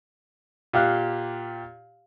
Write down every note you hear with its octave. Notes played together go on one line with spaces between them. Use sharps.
A#2 G4 F5 F#6